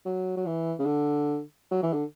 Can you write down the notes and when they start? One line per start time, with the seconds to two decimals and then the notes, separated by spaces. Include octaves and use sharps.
0.06 F#3
0.37 F#3
0.46 E3
0.79 C#3
0.86 D3
1.71 F#3
1.83 E3
1.93 D3